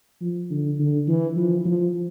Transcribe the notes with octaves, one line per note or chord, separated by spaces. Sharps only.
F3
D3
D3
E3
F3
F3